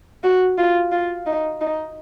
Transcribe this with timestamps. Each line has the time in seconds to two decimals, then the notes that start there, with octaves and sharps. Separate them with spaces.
0.23 F#4
0.58 F4
0.92 F4
1.26 D#4
1.61 D#4